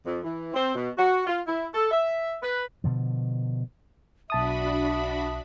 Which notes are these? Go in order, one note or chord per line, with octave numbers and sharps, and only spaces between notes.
F2
E3
C4
B2
F#4
F4
E4
A4
E5
B4
B2 D3 F3
B1 D4 F#4 E5 A5 B5 D#6